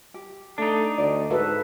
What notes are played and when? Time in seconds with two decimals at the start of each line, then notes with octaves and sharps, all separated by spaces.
0.14 G4
0.58 A3 D4 D#4
0.98 D2 D5 D#5
1.30 G#2 F#4 A4 B4 E5